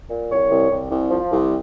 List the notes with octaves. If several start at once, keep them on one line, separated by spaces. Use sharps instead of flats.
A#2
C2 C#5
C2
C2
C2
F3
C2